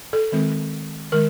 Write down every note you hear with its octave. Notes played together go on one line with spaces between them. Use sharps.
A4
D#3 G#3 C4
D#3 G#3 A#4